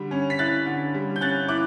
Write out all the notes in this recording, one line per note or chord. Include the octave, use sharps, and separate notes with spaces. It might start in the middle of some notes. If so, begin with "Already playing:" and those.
Already playing: D3 G3
C#4
B6
E4 F#6 A6
D3
G3
G6
C#4 F#6 A6
E4 D6 F#6